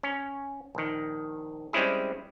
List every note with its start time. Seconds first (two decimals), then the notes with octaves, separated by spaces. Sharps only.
0.03 C#4
0.75 A#1 D#3
1.73 G3 G#3 C4 C#4 E4 G#4